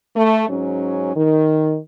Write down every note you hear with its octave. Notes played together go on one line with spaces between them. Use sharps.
A3
G#2 F#3 C#4
D#3